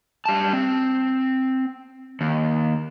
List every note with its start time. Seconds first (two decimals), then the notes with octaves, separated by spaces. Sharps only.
0.26 G3 A5
0.53 C4
2.21 D#2